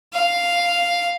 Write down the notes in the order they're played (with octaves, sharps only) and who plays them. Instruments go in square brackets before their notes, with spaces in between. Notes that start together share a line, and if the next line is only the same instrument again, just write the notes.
[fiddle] F5